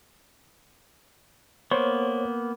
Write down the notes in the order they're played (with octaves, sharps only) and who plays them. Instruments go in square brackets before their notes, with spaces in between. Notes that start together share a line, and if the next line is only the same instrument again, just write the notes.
[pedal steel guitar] A#3 B3 [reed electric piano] C5 C#5